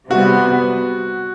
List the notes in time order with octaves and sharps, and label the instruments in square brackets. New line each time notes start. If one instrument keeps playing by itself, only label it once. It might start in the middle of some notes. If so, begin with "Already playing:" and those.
[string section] C3 G3 B3 [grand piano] F#4